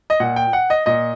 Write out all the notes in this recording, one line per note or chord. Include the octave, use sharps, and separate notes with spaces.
D#5
A#2 F#5
G5
F#5
D#5
A#2 D#5